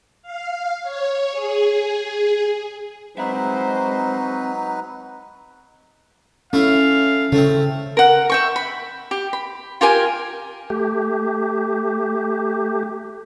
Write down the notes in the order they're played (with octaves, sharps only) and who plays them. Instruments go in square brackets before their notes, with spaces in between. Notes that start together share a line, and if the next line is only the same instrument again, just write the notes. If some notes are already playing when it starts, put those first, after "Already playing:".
[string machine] F5
C#5
G#4
[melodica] F#3 D#4 B4 [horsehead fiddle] G#3 C5 [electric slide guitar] C4 E5
[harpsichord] A3 E4 [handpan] C#4 [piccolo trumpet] F5
[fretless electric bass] C#3 [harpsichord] A3 C4
[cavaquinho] A#4 F#5
E5 G5 C#6
B5
G4
B5
F4 G4 A#4 G#5
[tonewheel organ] A3 G4